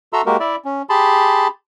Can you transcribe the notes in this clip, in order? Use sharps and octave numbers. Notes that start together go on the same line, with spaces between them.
F#4 A4 E5 A#5 C6 E6
G#3 A#3 F#4 G4 A#4
E4 D5 E5
C#4
G4 G#4 A5 B5 C6